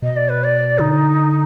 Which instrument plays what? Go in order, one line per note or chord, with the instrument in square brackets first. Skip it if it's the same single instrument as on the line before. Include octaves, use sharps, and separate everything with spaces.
[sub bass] B2 [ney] D#5
[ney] D5
B4
D5
[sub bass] D3 [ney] D#4